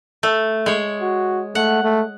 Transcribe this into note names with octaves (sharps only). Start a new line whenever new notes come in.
A3
G#3 C#5
F#4
A3 F#5
A3